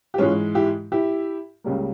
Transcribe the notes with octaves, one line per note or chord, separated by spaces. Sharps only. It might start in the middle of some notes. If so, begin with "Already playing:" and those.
G4
G#2 E3 G#3 C#4 F4
E4 G4
E4 G4
C#2 C#3 G3 A#3